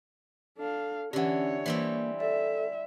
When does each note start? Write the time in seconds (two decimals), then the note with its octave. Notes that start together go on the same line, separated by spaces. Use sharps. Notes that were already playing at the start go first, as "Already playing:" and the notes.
0.57 D4 A4 F5
1.13 D3 E3 C#4 G4 C#5 F#5
1.66 E3 G3 A#3 C4
2.20 A4 D5 E5